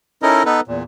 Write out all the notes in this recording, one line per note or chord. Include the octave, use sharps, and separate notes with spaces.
C#4 D#4 E4 A4 A#4 D#5
B3 D#4 A4 B4
E2 A#2